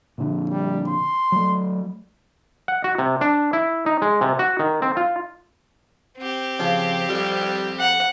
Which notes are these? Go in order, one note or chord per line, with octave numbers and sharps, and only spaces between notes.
A#2 D3 F3
G3
C6
F#3 A3
F#5
F#4
C3
D4
E4
D#4
G#3
C3
F#4
D#3
C4
F4
C4 G4
C#3 F3
F2 G3
F#5